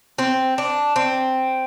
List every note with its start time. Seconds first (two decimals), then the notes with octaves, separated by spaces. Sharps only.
0.18 C4
0.58 D4
0.96 C4